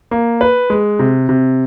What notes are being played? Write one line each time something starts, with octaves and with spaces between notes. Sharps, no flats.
A#3
B4
G#3
C3
C3